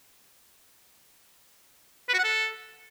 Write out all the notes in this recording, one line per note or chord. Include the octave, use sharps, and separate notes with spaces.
B4
F#4
F#5
A4